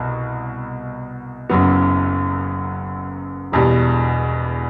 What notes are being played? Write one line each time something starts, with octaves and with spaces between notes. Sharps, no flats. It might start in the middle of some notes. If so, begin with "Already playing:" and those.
Already playing: C2 B2
F#1 F#2 F#3 B3
E1 E2 B2 G3